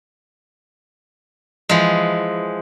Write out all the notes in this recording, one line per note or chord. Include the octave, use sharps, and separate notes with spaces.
E3 F3 G#3